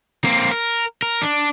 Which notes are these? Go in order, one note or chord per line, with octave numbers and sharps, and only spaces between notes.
A#3 C4
A#4
A#4
D4